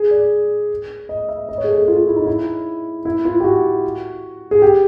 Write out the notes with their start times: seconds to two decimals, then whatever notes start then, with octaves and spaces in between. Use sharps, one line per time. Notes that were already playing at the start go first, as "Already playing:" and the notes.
Already playing: G#4
0.11 D5
1.09 D#5
1.29 E5
1.49 D#5
1.58 C#5
1.64 G#4
1.68 A4
1.78 G#4
1.88 F4
2.07 E4
2.16 D#4
2.26 E4
3.05 E4
3.25 F4
3.40 G4
3.44 F#4
4.51 G#4
4.62 G4